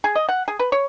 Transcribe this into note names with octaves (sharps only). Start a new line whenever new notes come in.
G#4
D#5
F#5
G#4
B4
C#5